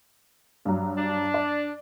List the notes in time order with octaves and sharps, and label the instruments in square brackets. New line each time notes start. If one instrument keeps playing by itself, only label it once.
[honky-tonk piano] G2 F#3
[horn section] D4
[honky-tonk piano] D5